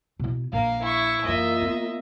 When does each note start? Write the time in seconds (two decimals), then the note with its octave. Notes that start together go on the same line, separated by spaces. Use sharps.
0.20 B2 E4
0.53 A#1 A#3 F5
0.82 E4 C#6
1.24 F#2 E3 A#3 F4 D#5 E5
1.62 B3